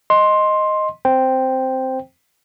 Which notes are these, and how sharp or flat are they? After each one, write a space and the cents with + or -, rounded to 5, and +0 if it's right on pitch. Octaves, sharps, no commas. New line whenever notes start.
D#5 +0 C6 +10
C4 +0 C5 +0 G5 +0